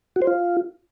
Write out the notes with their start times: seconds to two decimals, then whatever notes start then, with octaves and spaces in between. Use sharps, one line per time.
0.16 F#4
0.22 C5
0.27 F4